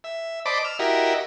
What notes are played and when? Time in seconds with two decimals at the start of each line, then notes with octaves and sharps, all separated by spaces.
0.04 E5
0.46 C5 D5 D#5 A5 B5 D6
0.65 E6 F6
0.79 E4 F#4 G4 A#4 D#5 E5